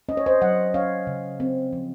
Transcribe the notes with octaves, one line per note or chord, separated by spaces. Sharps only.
C#4 D#5
C#5
C5 D#5
F#3 D#5 F#5
C#4 C#5 F5
C#3
C4
F3